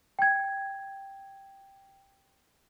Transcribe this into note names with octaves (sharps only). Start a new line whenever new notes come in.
G5 G#6